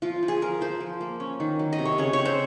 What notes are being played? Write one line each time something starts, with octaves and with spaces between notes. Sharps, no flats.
F3 F4
F3
G#4
F3 A#4
F3 C5
F3
A#3
C#4
D#3
F#3
D#5
C3
C#5
C#3 C#5
C#5
C4
C5